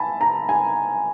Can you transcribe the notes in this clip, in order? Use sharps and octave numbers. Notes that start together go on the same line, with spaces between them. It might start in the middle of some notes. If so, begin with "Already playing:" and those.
Already playing: G#5 A5 B5
A#5
G#5